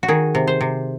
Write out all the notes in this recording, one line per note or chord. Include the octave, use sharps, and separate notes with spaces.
F#4
D#3 G#4
C3
C5
C3